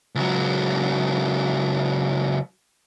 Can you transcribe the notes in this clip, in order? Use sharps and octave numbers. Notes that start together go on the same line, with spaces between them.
C#2 F#3